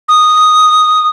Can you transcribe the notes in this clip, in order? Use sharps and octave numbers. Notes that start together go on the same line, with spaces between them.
D#6